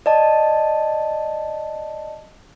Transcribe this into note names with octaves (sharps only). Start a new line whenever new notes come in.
D5 D#5 A5